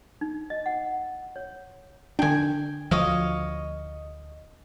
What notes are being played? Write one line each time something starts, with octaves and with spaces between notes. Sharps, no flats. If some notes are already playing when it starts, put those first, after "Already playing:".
D#4
D#5
F#5
C#5
D3 D4 G5 G#5
D2 F3 C#5 D#5 F5